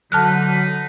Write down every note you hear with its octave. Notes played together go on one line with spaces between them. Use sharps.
D3 F#3 D#4 B4 A5 F6 F#6